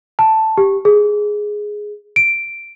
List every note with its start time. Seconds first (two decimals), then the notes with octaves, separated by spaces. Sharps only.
0.19 A5
0.58 G4
0.85 G#4
2.16 D7